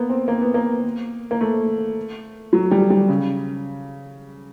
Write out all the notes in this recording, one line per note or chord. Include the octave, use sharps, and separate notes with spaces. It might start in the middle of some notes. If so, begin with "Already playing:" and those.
Already playing: A#3 B3
C4
A#3
B3
A#3
A#3
A3
F#3
G3
G3
C#3